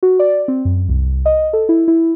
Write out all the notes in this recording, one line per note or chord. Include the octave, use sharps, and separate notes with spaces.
F#4
D5
C4
F#2
C2
D#5
A4
E4
E4